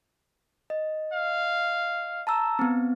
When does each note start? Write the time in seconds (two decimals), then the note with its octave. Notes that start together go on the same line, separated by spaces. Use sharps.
0.70 D#5
1.13 F5
2.27 A5 A#5 E6
2.59 B3 C4